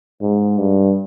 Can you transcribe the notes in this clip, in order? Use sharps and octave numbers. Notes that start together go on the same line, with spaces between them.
G#2
G2